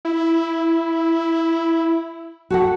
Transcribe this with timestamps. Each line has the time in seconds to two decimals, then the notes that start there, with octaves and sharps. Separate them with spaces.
0.05 E4
2.50 F#4 A4 F#5